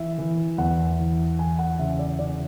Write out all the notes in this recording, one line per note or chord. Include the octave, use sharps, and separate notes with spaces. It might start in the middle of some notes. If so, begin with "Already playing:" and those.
Already playing: E3 E5
E3
E2 F#5
E3
E3 G#5
F#5
C#3 E5
D5
C#3 D5